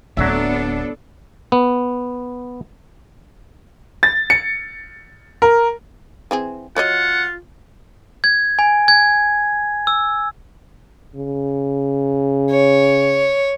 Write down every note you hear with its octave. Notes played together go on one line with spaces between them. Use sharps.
D1 D3 F#3 B3 D4 A4 E5
B3
A6
C#7
A#4
E3 C4 G#4
F#3 F4 C#5 D#5 F#5
G#6
G#5
G#6
E6
C#3
C#5